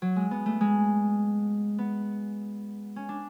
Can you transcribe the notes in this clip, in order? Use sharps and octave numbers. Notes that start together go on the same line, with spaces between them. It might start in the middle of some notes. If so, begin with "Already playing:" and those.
F#3
G#3
B3
A3
G#3
B3
C#4
D4